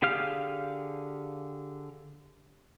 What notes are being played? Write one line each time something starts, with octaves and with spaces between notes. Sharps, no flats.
D3 G4 G#4 F5 F6